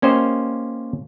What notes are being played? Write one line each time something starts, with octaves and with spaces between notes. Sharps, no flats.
A#3 C#4 G4 C5 D#5